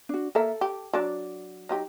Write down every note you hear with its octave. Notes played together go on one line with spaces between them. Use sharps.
D4 F#4
A#3 A4 A#4 E5
G4
F#3 D4 F#4 D5
F#3 D#4 G4